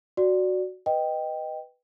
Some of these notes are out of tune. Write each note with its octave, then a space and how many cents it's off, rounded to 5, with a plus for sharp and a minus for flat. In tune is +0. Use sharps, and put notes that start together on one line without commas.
F#4 +0 D5 +0
B4 +0 D#5 -5 G5 +0